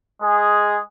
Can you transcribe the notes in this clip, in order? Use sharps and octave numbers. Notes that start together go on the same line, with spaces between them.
G#3 G#4